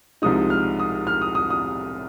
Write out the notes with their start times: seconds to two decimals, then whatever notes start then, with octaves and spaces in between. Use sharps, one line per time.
0.22 C2 C3 F3 G#3 D#4 D#6
0.50 F6
0.79 D#6
1.07 F6
1.22 D#6
1.35 D#6
1.50 D#6